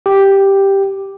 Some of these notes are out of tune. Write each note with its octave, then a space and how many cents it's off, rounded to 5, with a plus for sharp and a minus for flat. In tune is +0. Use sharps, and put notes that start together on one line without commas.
G4 +0